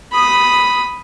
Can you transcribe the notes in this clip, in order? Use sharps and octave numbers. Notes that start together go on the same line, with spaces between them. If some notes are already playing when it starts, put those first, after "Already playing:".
B5 D#6